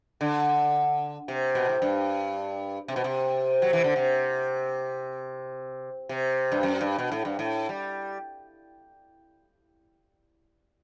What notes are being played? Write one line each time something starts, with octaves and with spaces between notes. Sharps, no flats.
D3
C3
B2
A2
G2
C3
B2
C3
F#3
E3
D3
C3
C3
G2
F#2
G2
B2
A2
G2
A2
G3